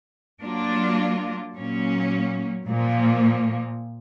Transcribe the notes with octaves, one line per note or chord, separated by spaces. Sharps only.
F#3 A#3 D4 F4
A#2 F#3 A#3 C#4
A#2 F3 A#3